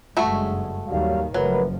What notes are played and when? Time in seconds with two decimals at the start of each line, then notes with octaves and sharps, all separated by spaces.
0.17 F#1 G2 G#3 A3 F#4 E5
0.88 D#2 G#2 D#3 F#3 G3 F5
1.34 F#1 F#2 F3 F#3 A3 A#4 B4